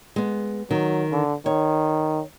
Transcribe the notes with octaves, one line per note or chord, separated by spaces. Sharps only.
G#3 B3
D#3 F#3
D3
D#3 C#5